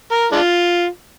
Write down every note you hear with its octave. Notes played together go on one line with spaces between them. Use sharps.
A#4
G#3 D4 F4